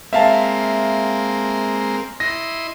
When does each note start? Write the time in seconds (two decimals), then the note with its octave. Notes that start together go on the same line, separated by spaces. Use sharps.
0.13 G#3 A#3 C4 E5 F5 A5
2.20 E4 D#5 C6 A#6